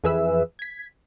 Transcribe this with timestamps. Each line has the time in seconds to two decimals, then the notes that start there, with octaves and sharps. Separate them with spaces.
0.04 F2 E3 G#4 B4 E5 E6
0.59 G#6 B6